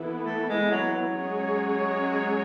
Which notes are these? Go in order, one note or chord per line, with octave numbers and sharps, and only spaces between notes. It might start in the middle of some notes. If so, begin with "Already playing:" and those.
Already playing: E3 B3 E4 A4
A3
G#3
F#3
F#3
G#3 C#4 G#4 C#5